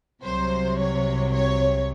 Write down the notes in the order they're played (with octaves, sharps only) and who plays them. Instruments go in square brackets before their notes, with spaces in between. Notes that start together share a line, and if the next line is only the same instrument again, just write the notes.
[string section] C2 C3 F#3 C5
C#5
C#5